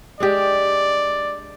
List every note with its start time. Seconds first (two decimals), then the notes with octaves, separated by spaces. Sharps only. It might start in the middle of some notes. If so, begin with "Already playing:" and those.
0.20 G#3 D4 G4 D5